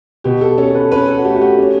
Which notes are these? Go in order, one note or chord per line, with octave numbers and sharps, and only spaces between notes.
B2 G4
A4
C#4 A4
A4
B4
C#4 B4
A4
F#4
A3 G4
F#4
G4
C#4